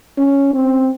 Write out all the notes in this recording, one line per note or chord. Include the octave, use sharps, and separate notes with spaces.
C#4
C4